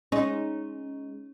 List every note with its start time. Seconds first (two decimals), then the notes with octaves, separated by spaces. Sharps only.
0.12 G#3 C#4 D#4